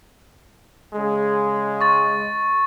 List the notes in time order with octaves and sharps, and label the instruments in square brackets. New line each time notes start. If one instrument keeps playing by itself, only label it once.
[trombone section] C#3 G#3
[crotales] C#6 A6